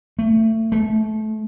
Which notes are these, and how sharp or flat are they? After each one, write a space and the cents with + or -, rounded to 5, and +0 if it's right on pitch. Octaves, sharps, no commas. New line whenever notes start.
A3 +25
A3 -25